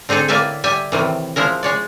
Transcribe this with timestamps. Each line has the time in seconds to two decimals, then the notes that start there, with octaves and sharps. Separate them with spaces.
0.09 D3 C4 D#4 G#4 A4
0.28 A2 A#3 B4 D5 E5 G#5
0.64 G3 E5 G#5
0.92 A2 C3 D#3 E3
1.36 F3 G#3 E4 A#4
1.63 G#3 C#5 D5